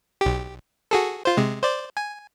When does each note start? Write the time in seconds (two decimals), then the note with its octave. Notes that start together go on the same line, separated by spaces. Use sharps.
0.21 B1 G4
0.91 F#4 G#4 A4
1.25 F4 C5
1.37 C3 G#3
1.62 C5 D5
1.97 G#5